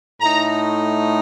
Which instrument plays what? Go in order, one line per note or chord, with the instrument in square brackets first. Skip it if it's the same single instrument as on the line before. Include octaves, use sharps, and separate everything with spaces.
[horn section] A2 A3 D#4 A#5